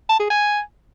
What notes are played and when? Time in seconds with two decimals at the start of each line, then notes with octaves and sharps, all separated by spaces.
0.09 A5
0.20 G#4
0.30 G#5